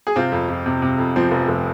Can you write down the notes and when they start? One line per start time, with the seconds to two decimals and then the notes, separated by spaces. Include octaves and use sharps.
0.07 G#4
0.16 C3 C4 F4
0.32 F2
0.49 F2
0.66 C3
0.82 C3
0.98 F2
1.16 F3 C4
1.31 F1
1.48 F1